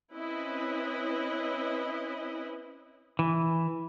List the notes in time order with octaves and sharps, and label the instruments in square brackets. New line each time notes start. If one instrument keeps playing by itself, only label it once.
[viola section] C4 C#4 E4 B4 D#5
[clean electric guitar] E3